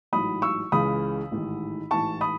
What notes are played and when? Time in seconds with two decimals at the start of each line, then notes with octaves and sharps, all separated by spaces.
0.13 A1 G#2 F#3 B5 D#6
0.42 C#6 E6
0.72 C#2 C#3 E3 G#3 B5 D#6
1.31 A1 G#2 D#3
1.91 A1 G#2 E3 A5 C#6
2.21 B5 D#6